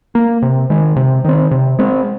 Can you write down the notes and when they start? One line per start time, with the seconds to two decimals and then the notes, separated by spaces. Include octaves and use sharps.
0.15 A#3
0.42 C3
0.70 D#3 G#3
0.96 C3
1.25 D#3 C4
1.51 C3
1.79 G#3 C4